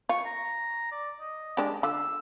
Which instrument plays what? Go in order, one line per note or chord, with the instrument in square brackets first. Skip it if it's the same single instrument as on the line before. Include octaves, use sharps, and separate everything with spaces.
[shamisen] F4 [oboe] C#6
[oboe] A#5
D5
D#5
[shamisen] G#3 D4 G4
[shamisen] D3 F4 [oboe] E6